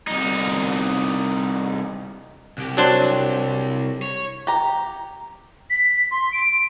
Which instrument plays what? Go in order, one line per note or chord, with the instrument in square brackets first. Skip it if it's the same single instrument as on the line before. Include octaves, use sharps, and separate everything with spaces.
[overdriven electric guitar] C2 D#4
C2 G4
[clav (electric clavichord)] F#3 D4 C5
[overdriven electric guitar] C#5
[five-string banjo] G4 A#5
[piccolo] B6
C6
D7